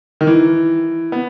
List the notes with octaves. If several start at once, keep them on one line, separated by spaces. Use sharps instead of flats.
D#3
E3
B3